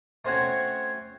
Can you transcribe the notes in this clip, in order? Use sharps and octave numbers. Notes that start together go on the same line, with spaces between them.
A3 C4 C#4 F#4 C#5